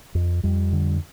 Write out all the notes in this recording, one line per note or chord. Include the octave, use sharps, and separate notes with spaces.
F2
F2 G3
D3